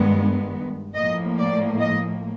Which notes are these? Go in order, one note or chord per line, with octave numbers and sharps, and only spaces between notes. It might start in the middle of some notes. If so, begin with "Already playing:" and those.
Already playing: G2 D#3 G#3 B3
A2 F3 A#3 D#5
D5
D#5